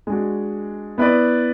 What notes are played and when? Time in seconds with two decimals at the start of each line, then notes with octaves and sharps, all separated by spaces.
0.07 G#3 D4 F#4
0.98 B3 E4 B4 D5